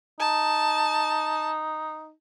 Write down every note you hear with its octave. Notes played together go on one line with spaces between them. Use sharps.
D#4 A5